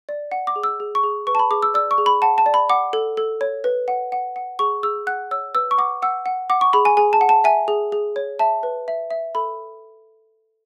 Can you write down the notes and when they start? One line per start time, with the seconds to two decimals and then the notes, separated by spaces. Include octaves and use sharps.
0.09 D5
0.32 F#5
0.47 D6
0.56 G#4
0.63 E6
0.80 G#4
0.95 C#6
1.03 G#4
1.27 B4 C#6
1.35 A5
1.39 B5
1.51 G#4 D6
1.63 E6
1.74 D5 E6
1.91 C#6
1.98 G#4
2.06 B5
2.22 F#5 A5
2.38 A5
2.46 D5
2.54 B5
2.70 F#5 D6
2.93 A4
3.17 A4
3.41 C#5
3.64 B4
3.88 F#5
4.12 F#5
4.36 F#5
4.59 G#4 C#6
4.83 G#4 E6
5.07 F#5 F#6
5.31 C#5 E6
5.55 B4 E6
5.71 C#6
5.78 F#5 D6
6.02 F#5 E6
6.26 F#5
6.50 F#5 D6
6.61 C#6
6.73 G#4 B5
6.85 G#5
6.97 G#4 G#5
7.13 A5
7.21 F#5
7.29 A5
7.44 E5 G#5
7.68 G#4
7.92 G#4
8.16 C#5
8.39 E5 A5
8.63 B4
8.88 E5
9.11 E5
9.35 A4 B5